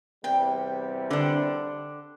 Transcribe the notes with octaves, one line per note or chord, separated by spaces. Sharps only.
E2 C3 G3 G5
D3 D4